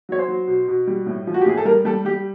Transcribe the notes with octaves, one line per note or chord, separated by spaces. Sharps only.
F#3 C#5
C5
F#3
B2
B2
G3
A2
F3
F#4
G4
A2 G#4
A4
G3 A#4
G3 A4
G3 G4